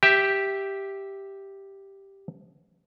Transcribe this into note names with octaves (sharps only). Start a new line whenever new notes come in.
G4 E5